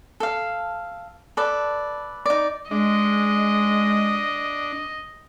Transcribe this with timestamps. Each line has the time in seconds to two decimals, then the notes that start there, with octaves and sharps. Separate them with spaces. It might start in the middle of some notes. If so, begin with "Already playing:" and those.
0.20 A4 F5
1.37 A4 B4 D5
2.26 D#4 D5
2.71 G#3 D4 D#5